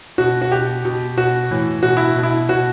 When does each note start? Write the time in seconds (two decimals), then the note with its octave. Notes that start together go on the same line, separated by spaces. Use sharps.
0.18 B2 F#4
0.42 F#4
0.52 B2 G4
0.85 B2
1.17 B2 F#4
1.51 A2 E3
1.83 B2 F#4
1.97 E4
2.16 B2
2.23 E4
2.49 B2 F#4